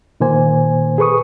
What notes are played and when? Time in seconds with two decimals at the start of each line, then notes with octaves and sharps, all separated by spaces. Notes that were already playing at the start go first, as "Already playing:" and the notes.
0.20 A#2 D#3 A#3 C5 G#5
0.98 G#4 A4 B4 C#6 D#6